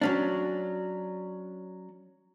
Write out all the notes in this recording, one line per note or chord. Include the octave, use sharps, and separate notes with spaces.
F#3 C#4 D4